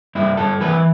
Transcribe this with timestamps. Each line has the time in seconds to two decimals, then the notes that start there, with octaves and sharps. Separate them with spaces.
0.15 G2 E4
0.37 G2 A4
0.60 E3 B4